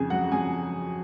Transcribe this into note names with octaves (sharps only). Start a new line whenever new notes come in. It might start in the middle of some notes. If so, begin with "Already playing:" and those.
Already playing: F2 C#3 G#4 G#5
F#3 F#4 F#5
F2 G#4 G#5